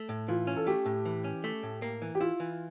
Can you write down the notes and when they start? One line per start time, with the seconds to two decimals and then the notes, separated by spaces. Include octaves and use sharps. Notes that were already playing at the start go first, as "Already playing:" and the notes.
Already playing: A3
0.09 A2
0.28 E3 F4
0.47 C#4
0.56 A4
0.67 A3 G4
0.86 A2
1.05 E3
1.24 C#4
1.44 A3
1.63 A2
1.82 A#3
2.02 E3
2.15 G4
2.20 E4 F4
2.40 E3